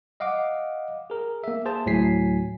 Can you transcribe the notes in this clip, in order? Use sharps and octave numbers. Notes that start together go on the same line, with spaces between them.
D#5 F5 F#5 D6
G#4 A#4
A#3 E5
G#4 C5 A5
D2 A2 F#3 G#5 B6 C7